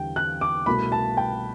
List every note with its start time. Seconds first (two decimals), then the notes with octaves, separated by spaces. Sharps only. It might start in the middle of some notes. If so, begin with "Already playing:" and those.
Already playing: E2 D3 G3 G5
0.16 F#6
0.41 D6
0.66 C2 B2 A3 B5
0.92 A5
1.17 G5